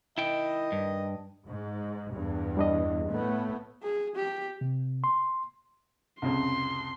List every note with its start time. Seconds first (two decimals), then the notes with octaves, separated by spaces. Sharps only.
0.18 D#3 E4 D#5 G5
0.72 G2
1.47 G#2
2.13 E2 G2
2.57 G3 D4 D#5
3.09 A2 A3 B3
3.83 G#4
4.15 G4
4.61 C3
5.04 C6
6.22 C2 F2 C#3 C6